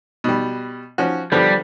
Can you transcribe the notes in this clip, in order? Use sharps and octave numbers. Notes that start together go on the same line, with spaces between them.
B2 G3
F3 C#4 F#4
D3 F3 G3 B3